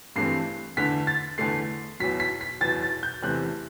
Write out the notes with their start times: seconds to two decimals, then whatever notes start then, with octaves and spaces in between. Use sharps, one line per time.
0.16 G2 E3 A3 C4 C7
0.77 E2 D3 A3 B6
1.07 A6
1.38 E2 D3 A3 C7
2.00 E2 B2 F#3 B6
2.20 B6
2.41 B6
2.61 E2 B2 F#3 A6
2.82 A6
3.03 G6
3.23 E2 C3 E3 A3 C4 F#6